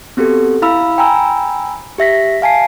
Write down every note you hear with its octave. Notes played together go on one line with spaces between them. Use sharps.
B3 C4 F#4 G4 A4
E4 F5 B5 E6
G5 G#5 A#5 B5 E6
G4 E5 A#6 B6
F5 G#5 A5 C7